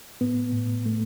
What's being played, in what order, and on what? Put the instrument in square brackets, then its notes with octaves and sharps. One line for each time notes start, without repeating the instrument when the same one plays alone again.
[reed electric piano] A2 B3
A2
A3